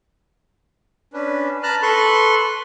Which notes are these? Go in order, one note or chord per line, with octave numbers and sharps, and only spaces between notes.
C#4 D4 B4
B4 A5 A#5 F6 F#6
A4 B4 C6 C#6 F#6